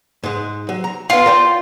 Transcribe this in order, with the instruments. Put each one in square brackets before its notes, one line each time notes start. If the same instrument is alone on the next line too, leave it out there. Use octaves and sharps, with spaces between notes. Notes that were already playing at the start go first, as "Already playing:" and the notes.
[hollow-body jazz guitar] G#2 G#3
F#3
A#5
[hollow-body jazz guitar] A2 B3 [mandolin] F4
[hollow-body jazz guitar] A#4 D5 G5